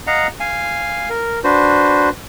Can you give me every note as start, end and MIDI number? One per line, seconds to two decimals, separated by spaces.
0.07 0.27 75
0.07 0.27 77
0.07 0.27 78
0.07 0.27 82
0.40 1.09 77
0.40 1.09 80
1.10 1.40 70
1.44 2.09 62
1.44 2.09 66
1.44 2.09 71
1.44 2.09 72